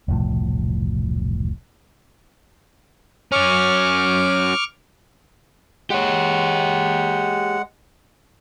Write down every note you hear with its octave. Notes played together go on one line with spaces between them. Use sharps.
E1 C2 A2 F3
F#3 C#4 C#6 D6 F6
G#3 G4 C#5 F#5